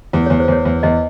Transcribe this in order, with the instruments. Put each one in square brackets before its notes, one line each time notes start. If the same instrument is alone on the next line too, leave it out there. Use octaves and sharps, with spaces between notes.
[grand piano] E2
[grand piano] E2 [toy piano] C#5
[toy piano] C5
[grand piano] E2 [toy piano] C#5
[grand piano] E2
[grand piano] E2 [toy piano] D#5